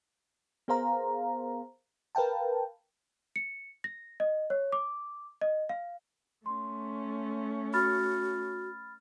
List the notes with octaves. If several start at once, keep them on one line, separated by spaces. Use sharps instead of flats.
B3 G#4 A#4 C5 F5 A#5
A#4 B4 F5 G5 A5
C#7
A#6
D#5
C#5
D6
D#5
F5
A3 C#4 C6
F#4 B5 F6 A6